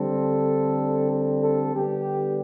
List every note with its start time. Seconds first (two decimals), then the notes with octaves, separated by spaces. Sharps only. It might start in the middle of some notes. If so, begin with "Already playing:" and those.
Already playing: D3 G3 C4 A4
1.10 A4
1.42 A4
1.72 D3 G3 B3 G4